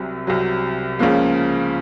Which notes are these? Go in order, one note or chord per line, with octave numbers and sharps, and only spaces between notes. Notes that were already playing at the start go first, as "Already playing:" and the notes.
Already playing: C2 C3 F#3
C2 C3 F#3
C#2 C#3 F3 A#3